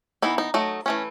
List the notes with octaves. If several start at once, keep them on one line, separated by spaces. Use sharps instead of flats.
E3 B3 D#4 E4
D#4
F#3 A3 D#4
E3 A3 C#4